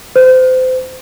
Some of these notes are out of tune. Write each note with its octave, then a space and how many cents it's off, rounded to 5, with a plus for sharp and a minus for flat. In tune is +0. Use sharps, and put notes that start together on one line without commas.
C5 -30